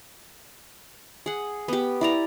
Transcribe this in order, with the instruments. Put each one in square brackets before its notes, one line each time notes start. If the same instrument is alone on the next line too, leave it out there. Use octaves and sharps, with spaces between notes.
[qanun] G#4 F#5
B3 G4
E4 D5 A#5